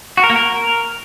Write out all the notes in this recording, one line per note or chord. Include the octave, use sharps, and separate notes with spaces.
F#4
A#4
A#3
A#4